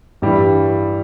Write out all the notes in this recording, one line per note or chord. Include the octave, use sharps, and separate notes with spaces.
G2 E3 G3